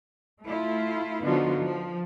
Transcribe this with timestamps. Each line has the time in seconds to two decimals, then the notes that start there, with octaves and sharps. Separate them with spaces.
0.44 A3 E4 F4
1.24 D3 F3 B3 D#4 F4 F#4
1.57 F3